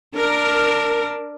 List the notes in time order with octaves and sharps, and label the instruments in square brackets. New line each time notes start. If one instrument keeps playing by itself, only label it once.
[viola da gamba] D4 [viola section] A#4